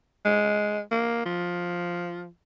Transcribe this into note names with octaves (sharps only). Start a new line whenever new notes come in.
G#3
A#3
F3